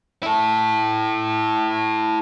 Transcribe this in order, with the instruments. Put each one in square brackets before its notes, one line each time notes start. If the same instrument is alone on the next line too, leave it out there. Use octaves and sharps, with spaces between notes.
[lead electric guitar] E4 A4